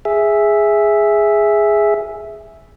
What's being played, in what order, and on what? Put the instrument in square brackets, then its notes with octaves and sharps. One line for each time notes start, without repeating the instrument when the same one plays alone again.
[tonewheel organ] G#4 E5